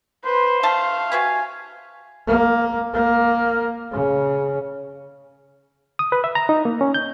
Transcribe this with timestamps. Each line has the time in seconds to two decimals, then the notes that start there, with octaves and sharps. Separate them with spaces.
0.25 B4 C5
0.63 A3 F5 A5
1.12 C3 F#4 B4 G#5
2.27 A#3
2.94 A#3
3.92 C#3
5.99 D#6
6.12 B4
6.24 E5
6.35 A#5
6.49 D#4
6.65 A#3
6.81 C#4
6.94 G6